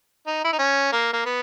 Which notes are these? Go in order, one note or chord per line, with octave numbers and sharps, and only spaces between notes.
D#4
E4
D#4
C#4
A#3
A#3
B3